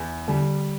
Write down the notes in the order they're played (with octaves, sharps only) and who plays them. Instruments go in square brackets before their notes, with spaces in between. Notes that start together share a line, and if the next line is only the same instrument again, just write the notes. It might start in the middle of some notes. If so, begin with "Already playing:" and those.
Already playing: [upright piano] E2
[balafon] D3 [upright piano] G3